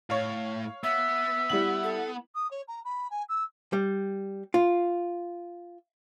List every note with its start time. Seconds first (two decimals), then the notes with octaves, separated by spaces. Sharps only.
0.10 A2 C#5 F5
0.84 B3 E5 E6
1.50 G3 E4 F#7
1.84 A4
2.34 D#6
2.51 C#5
2.68 A#5
2.84 B5
3.10 G#5
3.29 E6
3.73 G3
4.54 F4